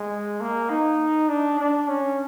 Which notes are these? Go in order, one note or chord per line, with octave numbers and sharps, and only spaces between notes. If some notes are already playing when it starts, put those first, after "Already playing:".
Already playing: G#3
A#3
D#4
D4
D4
C#4